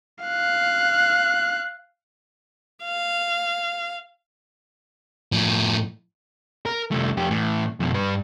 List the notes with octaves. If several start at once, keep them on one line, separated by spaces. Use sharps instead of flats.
F5 F#6
F5
A2 F3
A#4
C2 A3
F2 G4
A2 E3
F2 B2
G2 B4